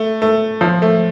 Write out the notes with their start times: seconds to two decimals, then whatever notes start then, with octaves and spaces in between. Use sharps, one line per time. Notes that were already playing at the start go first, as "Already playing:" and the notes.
Already playing: A3
0.22 A3
0.61 F3
0.82 A3